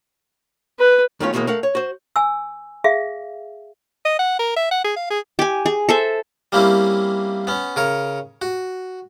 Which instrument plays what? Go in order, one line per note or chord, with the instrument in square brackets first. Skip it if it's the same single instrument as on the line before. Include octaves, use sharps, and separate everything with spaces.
[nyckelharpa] B4
[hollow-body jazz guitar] F#2 D#3 A3 B3 C#4 F4
D#2 B2 E3 F3 G#3 A#3
A3 A4 A#4 F5 F#5
C#5
F#4 C5
[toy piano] G#5 E6
G#4 E5 F5
[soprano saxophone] D#5
F#5
A#4
E5
F#5
G#4
F5
G#4
[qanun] G4 G#5
G#4
A4 C5 E5
[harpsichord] G3 A#3 C4 C#4 E4
B3 C#4
C#3 A#4 C#5
F#4